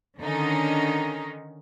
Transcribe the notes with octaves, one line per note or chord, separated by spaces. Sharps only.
D3 D#3 C#4 D#4